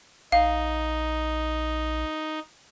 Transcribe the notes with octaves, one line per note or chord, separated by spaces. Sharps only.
A#1 D#4 F5